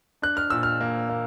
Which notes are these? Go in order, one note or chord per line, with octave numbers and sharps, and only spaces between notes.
D4 F#6
F6
A#2 E6
F6
A#3
A#3